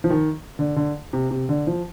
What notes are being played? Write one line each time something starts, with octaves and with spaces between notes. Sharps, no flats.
F3
D#3
D3
D3
C3
C3
D3
F3